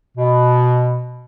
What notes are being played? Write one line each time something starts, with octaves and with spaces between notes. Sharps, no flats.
B2